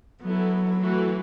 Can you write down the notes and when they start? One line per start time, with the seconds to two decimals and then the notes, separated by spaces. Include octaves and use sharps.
0.23 F#3 B3 E4 A4
0.80 E3 A3 F#4 B4